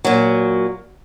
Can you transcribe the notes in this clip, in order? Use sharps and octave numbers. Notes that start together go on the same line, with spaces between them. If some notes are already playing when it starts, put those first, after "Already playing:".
A#2 F#3